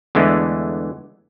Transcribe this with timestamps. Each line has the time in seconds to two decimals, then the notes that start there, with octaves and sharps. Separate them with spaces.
0.15 E2 D3 E3 G#3 A3